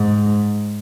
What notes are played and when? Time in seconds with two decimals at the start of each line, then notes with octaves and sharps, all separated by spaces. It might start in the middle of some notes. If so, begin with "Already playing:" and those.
Already playing: G#2